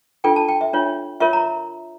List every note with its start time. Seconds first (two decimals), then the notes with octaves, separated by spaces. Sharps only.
0.24 D4 F4 A4 G5
0.36 A5
0.49 G5
0.61 E5
0.73 D4 F4 C#5
1.20 F4 A#4 C#5 E5
1.33 A#5